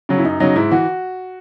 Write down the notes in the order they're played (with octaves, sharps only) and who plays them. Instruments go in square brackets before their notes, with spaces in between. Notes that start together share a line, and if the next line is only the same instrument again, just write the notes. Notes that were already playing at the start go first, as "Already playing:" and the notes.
[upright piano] C#3 F#3
E4
F#2 D#4
C#3 F#3 D#4
G#2 E4
E3 F#4